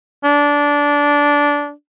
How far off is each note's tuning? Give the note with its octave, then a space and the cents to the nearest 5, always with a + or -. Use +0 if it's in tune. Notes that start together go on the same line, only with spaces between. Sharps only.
D4 -15